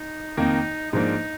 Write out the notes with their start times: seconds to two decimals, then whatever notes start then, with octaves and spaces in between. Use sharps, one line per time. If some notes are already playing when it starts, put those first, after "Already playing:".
Already playing: D#4
0.37 F2 D#3 A#3 D#4
0.93 G#2 F3 A#3 D4 D#4